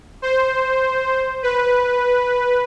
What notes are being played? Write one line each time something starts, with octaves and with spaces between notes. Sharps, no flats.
C5
B4